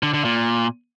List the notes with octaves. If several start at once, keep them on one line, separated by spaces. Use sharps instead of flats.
D3
D3
A#2